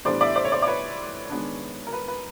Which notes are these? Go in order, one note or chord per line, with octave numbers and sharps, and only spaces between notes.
A2 E3 G3 B3 D4 C5 D5
D5 E5
C5 D5
C#5
C5 D5
D5
B4 C#5
D#3 G#3 B3 D4
A#4
B4
B4